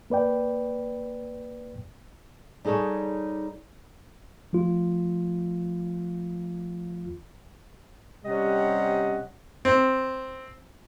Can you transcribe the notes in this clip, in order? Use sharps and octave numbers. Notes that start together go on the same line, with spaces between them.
A#3 B4 D5 G5
G3 D#4 G#4 A4 C#5
F3 A3 F4
C3 G3 C#4 D#5 F#5
C4